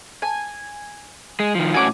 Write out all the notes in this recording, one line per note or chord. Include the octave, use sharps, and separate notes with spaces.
G#5
G#3
D#3 F3
A2 C#4 F#4 G#5 D6